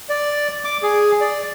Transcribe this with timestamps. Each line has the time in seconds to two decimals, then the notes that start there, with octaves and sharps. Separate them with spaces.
0.09 D5
0.64 D6
0.83 G#4
1.21 D5